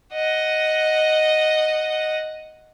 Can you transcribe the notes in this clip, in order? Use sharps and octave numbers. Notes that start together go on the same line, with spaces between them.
D#5 F#5